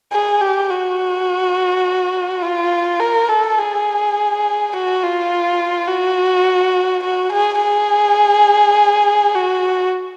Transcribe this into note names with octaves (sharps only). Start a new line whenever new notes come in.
G#4
G4
F#4
F4
A#4
A4
G#4
F#4
F4
F#4
F#4
G#4
G#4
F#4